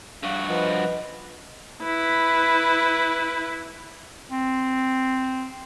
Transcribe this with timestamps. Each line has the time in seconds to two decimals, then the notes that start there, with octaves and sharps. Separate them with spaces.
0.23 G2 F#4 F5
0.49 F3 B4 D#5 F#5 B5
1.83 E4 B4
4.30 C4